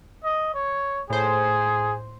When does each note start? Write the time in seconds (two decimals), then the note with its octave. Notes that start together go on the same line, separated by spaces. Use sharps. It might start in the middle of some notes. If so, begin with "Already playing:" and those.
0.24 D#5
0.54 C#5
1.10 A2 G#4 C5